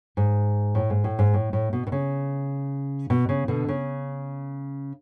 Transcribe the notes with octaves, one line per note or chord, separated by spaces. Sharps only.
G#2
A2
G#2
A2
G#2
A2
A2
B2
B2
C#3
B2
C#3
B2 D3
C#3